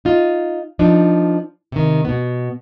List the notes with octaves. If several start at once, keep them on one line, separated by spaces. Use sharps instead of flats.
D#4 F4
F3 D4 D#4
C3 D#3
B2 B3